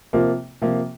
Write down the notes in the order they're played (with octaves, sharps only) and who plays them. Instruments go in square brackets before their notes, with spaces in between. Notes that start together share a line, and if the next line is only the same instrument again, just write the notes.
[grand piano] C3 F3 A#3 F4
C3 F3 A#3 F4